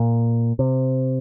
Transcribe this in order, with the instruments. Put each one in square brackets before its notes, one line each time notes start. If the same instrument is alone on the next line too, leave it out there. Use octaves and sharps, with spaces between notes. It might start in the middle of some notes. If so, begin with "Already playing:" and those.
Already playing: [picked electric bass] A#2
C3